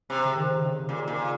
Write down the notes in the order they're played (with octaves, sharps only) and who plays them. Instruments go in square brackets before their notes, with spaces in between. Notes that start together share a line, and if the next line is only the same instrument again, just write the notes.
[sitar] C3
[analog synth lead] C#3
D#3
C#3
D#3
C#3
C3
[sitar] A#2 [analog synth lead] C#3
[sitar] A#2 [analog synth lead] D#3
[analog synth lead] C#3